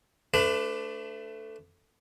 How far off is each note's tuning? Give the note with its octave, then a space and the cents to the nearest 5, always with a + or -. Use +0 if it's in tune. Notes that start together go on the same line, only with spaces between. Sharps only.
A3 +10 D4 +0 B4 +40